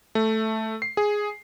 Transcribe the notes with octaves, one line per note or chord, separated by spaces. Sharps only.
A3
C7
G#4